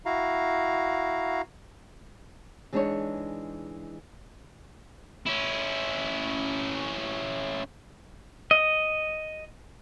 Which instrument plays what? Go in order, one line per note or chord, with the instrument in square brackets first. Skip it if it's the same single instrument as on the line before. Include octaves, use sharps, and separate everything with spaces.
[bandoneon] E4 F#4 F5 A#5
[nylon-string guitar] E3 G#3 C4 D4 D#4 C#5
[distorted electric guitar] C#4 E4
[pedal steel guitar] D#5